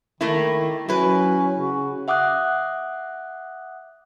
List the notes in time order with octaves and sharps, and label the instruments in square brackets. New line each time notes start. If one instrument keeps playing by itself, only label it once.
[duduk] D#3 [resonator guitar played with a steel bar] A3 A#3 E4
[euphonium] F#3 [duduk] C#4 [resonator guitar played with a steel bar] E4 B4
[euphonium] C#3 [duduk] F#4
[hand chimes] E5 F#5 D6 D#6 F#6